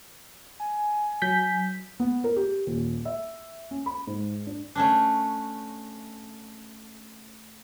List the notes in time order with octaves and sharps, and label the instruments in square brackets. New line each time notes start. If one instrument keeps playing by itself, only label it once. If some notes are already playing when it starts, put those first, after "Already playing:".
[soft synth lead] G#5
[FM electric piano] F#3 G6 B6
[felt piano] B3
A#4
G4
D#1
E5
C#4
B5
G#2
D4
[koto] A3 C#4 D4